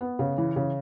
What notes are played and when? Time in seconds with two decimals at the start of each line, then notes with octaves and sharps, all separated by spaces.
0.01 B3
0.19 C#3
0.38 E3
0.56 C#3